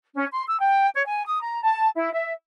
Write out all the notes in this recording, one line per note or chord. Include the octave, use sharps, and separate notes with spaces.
C#4
C6
E6
G5
C#5
G#5
D#6
A#5
A5
E4
E5